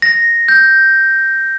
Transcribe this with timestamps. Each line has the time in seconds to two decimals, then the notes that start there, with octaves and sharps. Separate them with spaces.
0.02 A#6
0.48 G6